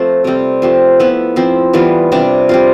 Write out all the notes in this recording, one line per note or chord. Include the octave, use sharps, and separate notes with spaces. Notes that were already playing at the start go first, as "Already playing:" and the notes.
Already playing: F3 A3 C4 F4 A4
C3 G3 C4
F3 A3 C4 G4
F3 B3 E4 B4
F3 C4 E4
E3 G3 B3 F4
C3 G3 D4
G3 C4 F4